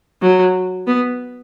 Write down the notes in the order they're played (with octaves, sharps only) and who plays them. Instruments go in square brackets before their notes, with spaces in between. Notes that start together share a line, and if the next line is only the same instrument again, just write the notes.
[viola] F#3
B3